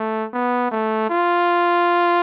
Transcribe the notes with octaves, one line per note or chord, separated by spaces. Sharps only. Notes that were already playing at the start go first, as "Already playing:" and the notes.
Already playing: A3
B3
A3
F4